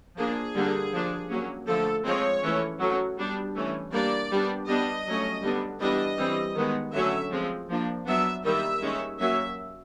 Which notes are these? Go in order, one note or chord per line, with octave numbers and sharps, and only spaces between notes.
F3 A#3 D4 G#4
D3 G3 A#3 D4
F3 A#3 D4
F#3 A#3 C#4
D3 F3 A3 A4
F3 G#3 C4 C#5
E3 A3 C#4
F#3 A3 C#4
G3 B3 D4
E3 A3 C#4
G3 A#3 D4 D5
G3 B3 D4
G3 B3 D4 D#5
F#3 A3 C#4
D3 G3 B3 D4
E3 G3 B3 D4 D#5
E3 G3 C4
D#3 G#3 B3
D3 F#3 A3 C#4 E5
F3 G#3 C4
F3 A#3 D4
F#3 B3 D4 E5
D#3 G3 A#3 E5
D#3 G#3 C#4
F#3 A#3 C#4 E5